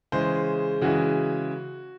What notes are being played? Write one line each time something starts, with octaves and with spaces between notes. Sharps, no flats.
C#3 E3 G#3 C5
C#3 E3 G#3 F#4